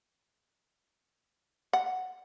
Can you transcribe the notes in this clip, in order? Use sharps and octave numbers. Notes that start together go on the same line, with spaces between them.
F#5